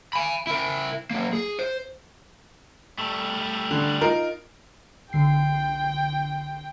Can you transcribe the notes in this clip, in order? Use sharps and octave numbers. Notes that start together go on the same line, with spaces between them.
G#5 B5
E4 A#4
F#3 A#3
G#4
C5
G3 A3
D3
D#4 F4 A#4
B1 D3 G5 C7